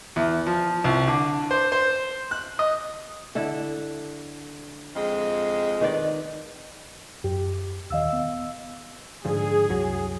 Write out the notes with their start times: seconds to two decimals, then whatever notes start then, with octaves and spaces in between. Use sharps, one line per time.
0.16 E2
0.46 F3
0.84 C2
1.08 D3
1.51 C5
1.72 C5
2.31 F#6
2.59 D#5
3.35 D3 E4 A4
4.96 F2 G#3
5.81 D#3 B4 D5
7.24 F#2 G4
7.90 D#1 D#3 D#5 F5 E6
8.13 B3
9.25 G#2 D3 F3 G#4
9.69 C2 F#2 F#3